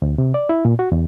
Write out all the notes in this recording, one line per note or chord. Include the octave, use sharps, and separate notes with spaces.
D2
C3
D5
E4
A#2
F#4
E2